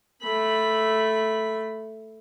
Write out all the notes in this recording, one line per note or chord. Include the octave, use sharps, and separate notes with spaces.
A3 B5